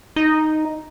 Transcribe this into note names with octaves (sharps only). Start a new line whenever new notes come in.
D#4